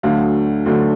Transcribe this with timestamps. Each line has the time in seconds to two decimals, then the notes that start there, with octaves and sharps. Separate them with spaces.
0.03 D2 D3 F#3 A3 F5
0.66 D2 D3 F#3 A3